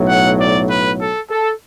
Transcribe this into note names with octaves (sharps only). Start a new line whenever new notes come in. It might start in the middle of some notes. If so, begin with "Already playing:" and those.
Already playing: B1 A2 F#3
F#5
D5
B4
A4
A4